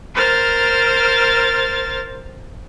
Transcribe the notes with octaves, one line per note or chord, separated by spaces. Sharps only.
A#4 C5 F6 A6